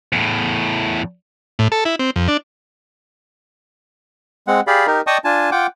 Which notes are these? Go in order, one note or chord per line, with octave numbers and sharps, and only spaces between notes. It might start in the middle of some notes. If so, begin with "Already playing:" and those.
E2 A2
A2
A4
E4
C4
F2
D4
G#3 C4 F#5
G4 G#4 D5 F5 B5
D#4 G4 A#4
D5 D#5 G5 A5 C#6 D#6
D4 F4 G#5 A5
F4 F#5 G5 D6